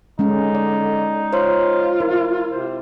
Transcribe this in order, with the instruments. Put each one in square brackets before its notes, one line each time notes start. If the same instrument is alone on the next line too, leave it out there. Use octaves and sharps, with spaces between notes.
[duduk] D3 [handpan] G#3 C#4 [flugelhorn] D#4
[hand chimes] D5
[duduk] F4 [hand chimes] C5 C#5 C6
[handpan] E4 [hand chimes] A#4
[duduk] C3 [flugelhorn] C5